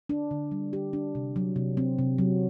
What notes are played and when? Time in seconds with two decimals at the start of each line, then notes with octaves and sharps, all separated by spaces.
0.09 D4
0.31 D3
0.52 G3
0.73 G4
0.93 D4
1.15 C3
1.36 F#3
1.56 C3
1.77 C4
1.99 C3
2.18 F#3